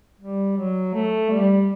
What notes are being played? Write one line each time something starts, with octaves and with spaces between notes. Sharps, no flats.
G3
F#3
A3
G3